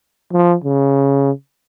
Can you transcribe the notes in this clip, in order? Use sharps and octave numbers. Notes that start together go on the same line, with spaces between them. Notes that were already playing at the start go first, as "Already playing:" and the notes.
F3
C#3